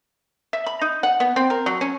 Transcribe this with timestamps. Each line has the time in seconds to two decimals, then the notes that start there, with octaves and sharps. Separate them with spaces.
0.53 E5
0.66 B5
0.81 D#4
1.03 F#5
1.20 B3
1.36 C4
1.50 A#4
1.66 F#3
1.81 C#4